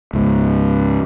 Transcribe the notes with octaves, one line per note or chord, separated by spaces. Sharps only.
C#2 G#2